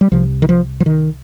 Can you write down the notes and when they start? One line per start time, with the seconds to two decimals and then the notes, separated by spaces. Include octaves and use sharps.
0.01 G3
0.11 C2 C3 F3
0.42 D#3
0.49 F3
0.80 F3
0.86 D#3